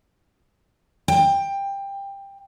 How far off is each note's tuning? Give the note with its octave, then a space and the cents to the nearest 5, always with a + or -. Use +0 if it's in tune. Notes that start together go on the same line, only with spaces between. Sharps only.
G5 +15